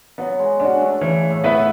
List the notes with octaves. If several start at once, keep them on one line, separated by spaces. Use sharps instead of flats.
F#3 B3
G#3
C#4 D4 F#4
A3
C#3 E3
A2
B3 E4 B4 E5